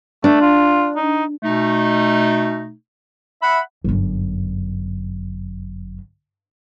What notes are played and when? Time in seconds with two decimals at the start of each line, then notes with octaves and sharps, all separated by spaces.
0.24 A3 D4
0.41 F4
0.96 D#4
1.43 B2 A3 D#4
3.42 E5 F#5 B5
3.84 G1 F#2